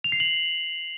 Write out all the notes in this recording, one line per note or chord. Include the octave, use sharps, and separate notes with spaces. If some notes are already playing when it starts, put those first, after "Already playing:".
F7
C7
F#7